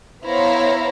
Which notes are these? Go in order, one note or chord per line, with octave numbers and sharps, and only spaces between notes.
B3 E4 C5 C#5 F5 A#5